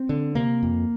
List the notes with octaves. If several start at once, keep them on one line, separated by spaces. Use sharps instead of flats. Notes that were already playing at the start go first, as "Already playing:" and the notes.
Already playing: C4
D3
C3 A#3
F2